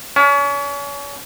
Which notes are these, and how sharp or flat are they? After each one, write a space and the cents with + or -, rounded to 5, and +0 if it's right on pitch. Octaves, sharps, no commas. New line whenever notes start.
C#4 +35